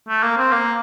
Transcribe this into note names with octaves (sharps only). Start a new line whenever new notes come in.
A3
A#3
C4
A#3